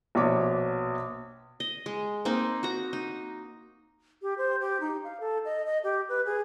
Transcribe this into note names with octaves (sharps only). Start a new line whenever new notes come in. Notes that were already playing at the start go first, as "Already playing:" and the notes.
A#1 B2 C#5 D6
D#5
G#3
A#3 C4 D#4
F#4 A#5
D#4
G4
C5
G4
D#4
F5
A4
D#5
D#5
G4
B4
G#4